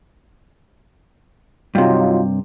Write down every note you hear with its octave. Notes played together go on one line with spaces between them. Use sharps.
G2 C3 F#3 D#4 F4